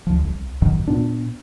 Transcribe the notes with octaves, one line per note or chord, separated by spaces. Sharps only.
D2 F3
C2
A1 F#2 D#3 F#3
A#2 B3 D4